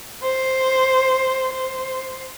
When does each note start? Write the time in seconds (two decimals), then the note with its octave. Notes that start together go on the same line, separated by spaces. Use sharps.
0.23 C5
1.53 C5